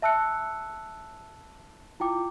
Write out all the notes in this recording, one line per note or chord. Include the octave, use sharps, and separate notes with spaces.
E5 A5 E6 F#6 C#7
E4 F4 G5 D6